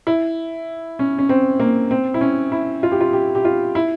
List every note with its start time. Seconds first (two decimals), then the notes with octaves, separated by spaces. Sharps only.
0.07 E4
0.99 C#4
1.18 C#4
1.29 C4
1.60 A#3
1.91 C4
2.14 E4
2.21 C#4
2.52 E4
2.83 F4
2.92 G4
3.01 F4
3.13 G4
3.35 G4
3.45 F4
3.75 E4